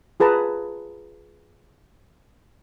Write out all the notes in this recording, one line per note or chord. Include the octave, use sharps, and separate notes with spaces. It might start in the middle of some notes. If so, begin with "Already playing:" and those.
F4 G#4 B4 A5 A#5